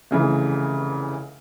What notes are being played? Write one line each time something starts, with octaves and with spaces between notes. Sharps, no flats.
F1 C#3 E3